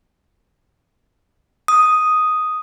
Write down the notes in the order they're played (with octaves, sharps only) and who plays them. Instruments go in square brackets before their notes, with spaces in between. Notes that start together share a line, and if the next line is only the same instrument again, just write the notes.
[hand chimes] D#6